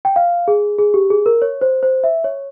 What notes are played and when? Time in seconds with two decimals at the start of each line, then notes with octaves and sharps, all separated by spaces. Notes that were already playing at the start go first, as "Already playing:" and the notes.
0.05 G5
0.16 F5
0.48 G#4
0.79 G#4
0.94 G4
1.10 G#4
1.26 A#4
1.42 C#5
1.61 C5
1.83 C5
2.04 E5
2.24 C#5